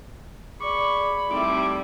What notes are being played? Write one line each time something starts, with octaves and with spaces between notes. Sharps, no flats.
G#4 D5 B5 C#6 D6
G3 A3 C4 D#4 E4 D6